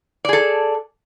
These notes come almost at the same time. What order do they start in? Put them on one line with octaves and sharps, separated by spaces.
D5 G#4 A4